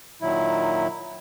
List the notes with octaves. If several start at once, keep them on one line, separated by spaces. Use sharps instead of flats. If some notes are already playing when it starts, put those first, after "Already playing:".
A#2 D#3 F#3 E4